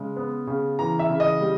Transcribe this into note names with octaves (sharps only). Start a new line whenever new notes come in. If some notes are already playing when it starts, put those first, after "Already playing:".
Already playing: C#3 G#3
B3
C#3
E3 A#5
E5
C#3
D#5
G3